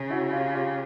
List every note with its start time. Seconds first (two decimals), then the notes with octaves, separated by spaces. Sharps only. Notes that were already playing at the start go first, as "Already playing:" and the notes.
Already playing: C#3
0.10 E4 F#4
0.33 F4 G4
0.55 F4 G4